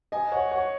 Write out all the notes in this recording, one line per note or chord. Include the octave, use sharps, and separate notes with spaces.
D#5 G#5
C#5 F#5
C#5 F#5